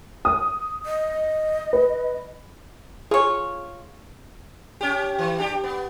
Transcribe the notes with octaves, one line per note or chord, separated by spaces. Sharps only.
D#6
D#5
B4
F4 G#4 C#5
C#4 G4
E3
D4 G4
B3